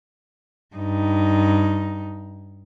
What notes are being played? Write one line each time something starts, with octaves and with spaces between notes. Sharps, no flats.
G2 D#4